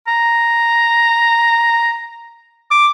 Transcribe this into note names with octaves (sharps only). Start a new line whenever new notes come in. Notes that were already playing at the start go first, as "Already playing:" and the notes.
A#5
D6